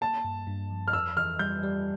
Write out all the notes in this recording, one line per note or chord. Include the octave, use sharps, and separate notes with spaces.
A#3 A5
G2
G2
F3
F6
F2 E6
E3 F6
G3 G6
G3